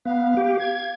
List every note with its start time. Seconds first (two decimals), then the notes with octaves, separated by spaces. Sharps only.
0.06 B3 F5
0.37 G4
0.60 G#6